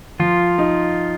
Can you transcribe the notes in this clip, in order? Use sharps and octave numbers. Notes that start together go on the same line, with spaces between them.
F3 F4
D#4